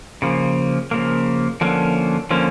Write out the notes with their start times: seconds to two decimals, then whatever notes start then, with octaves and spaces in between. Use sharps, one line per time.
0.22 C#3 F3 A#3
0.91 C#3 F3 A#3
1.61 D3 F3 A#3 C#4
2.31 D3 F3 A#3 C#4